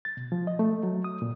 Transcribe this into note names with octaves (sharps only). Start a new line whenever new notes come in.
A6
B2
F3
D#5
A3
F#3
D#6
A#2